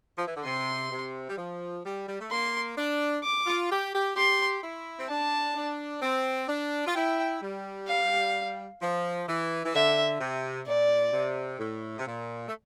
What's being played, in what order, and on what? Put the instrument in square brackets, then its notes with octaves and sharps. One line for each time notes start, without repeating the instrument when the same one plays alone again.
[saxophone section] F3
E3
D3
[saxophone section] C3 [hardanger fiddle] C6
[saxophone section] C3
G3
F3
G3
G3
A3
[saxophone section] A#3 [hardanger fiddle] C6
[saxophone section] D4
[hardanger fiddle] D6
[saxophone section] F4
G4
G4
[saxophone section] G4 [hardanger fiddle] C6
[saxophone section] E4
C4
[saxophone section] D4 [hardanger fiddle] A5
[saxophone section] D4
C4
D4
F4
[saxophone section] E4 [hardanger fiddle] G5
[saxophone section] G3
[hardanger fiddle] F5
[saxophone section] F3
E3
E3
[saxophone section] D3 [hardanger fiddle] E5
[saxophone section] C3
[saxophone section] A#2 [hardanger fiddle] D5
[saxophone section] C3
A2
C3
A#2
A3